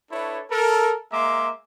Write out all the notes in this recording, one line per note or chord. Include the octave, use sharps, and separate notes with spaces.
D4 E4 A4 B4 C#5
A4 A#4
G#3 A#3 E5 A#5 C6 D6